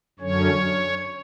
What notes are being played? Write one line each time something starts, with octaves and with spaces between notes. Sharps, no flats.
F#2 D3 F#3 C#4 C#5